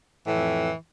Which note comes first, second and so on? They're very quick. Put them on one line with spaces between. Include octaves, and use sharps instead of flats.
E3 A2 F2